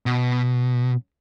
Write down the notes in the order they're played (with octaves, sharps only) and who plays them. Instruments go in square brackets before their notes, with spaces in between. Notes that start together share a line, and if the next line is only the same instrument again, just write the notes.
[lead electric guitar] B2